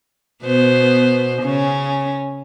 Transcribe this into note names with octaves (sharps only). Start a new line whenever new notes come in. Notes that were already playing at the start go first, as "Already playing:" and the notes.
B2 B3 C5
C#3 C#4